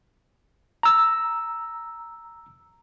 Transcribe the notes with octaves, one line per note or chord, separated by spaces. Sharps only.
A#5 E6